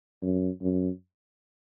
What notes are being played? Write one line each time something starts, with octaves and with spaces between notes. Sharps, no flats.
F#2
F#2